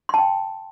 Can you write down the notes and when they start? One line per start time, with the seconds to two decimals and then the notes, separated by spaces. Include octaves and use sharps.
0.09 C6
0.14 A5
0.18 G5